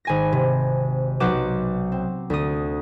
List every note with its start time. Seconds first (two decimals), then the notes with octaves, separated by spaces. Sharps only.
0.05 G#1 G#5 A#6
0.33 C3
1.20 B1 F#3 F#5 D6 G6 E7
1.92 C4
2.30 D2 D#6